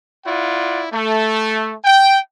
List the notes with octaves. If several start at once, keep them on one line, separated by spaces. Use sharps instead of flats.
E4 F4 D5 F#5
A3
G5